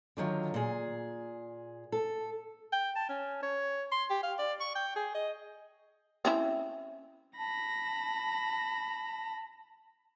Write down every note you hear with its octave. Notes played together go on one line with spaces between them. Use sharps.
D3 D#3 F#3 F4
A#2 G#4
A4
G5
A5
C#4
C#5
C6
G4
F5
D5
C#6
G5
G#4
D#5
C4 C#4 E4
A5 B5 A#6